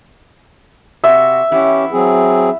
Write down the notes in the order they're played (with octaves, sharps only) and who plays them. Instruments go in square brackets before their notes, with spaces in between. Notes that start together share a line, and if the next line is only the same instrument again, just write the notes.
[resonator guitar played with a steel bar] C3 F#4 [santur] E5
[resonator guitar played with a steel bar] E3 B3 E4 [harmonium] C#4 G4
[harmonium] F#3 C4 G#4